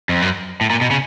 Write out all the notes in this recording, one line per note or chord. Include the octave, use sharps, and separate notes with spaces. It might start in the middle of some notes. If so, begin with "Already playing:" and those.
F2
F#2
A2
A#2
B2
C#3